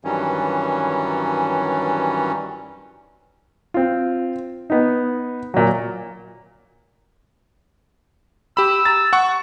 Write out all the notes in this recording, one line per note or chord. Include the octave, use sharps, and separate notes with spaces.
G2 D#3 E3 F#3 G3 C#4
C4 F4
B3 D#4
A#2 F#3
G4 B5 E6
A#5 A6
F#5 C#6